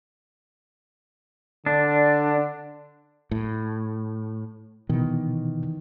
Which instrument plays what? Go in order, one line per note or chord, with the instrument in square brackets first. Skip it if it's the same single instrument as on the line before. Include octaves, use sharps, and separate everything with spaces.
[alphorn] D3 [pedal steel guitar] D4
[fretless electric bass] A2
[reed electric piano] B2 [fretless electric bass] D#3 E3